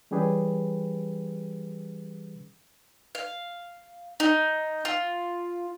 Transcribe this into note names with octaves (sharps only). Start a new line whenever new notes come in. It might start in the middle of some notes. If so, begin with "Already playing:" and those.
E3 G3 C#4 G4 G#4 B4
F5
D#4
F4